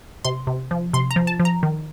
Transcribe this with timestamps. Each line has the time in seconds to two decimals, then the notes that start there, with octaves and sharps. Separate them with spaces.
0.25 C3 C6
0.47 C3
0.71 F3
0.93 C3 C6
1.11 A#5
1.16 F3
1.27 A5
1.40 F3
1.45 A#5
1.63 D#3